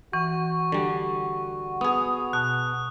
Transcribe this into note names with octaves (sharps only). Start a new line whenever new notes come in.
E3 F#4 C#6
D3 G3
B3 G#4 D#6
B2 A5 F#6